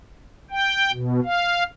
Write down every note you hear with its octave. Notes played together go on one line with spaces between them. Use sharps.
G5
B2
F5